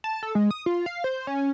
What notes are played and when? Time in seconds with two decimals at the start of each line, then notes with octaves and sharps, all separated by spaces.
0.04 A5
0.23 A4
0.35 G#3
0.51 D#6
0.66 F4
0.86 F5
1.04 C5
1.27 C#4